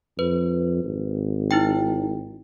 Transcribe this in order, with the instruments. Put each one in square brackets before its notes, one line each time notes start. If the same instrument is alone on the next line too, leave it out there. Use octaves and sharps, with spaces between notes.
[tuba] F2 [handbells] B4
[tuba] G#1
[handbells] D#4 E4 G5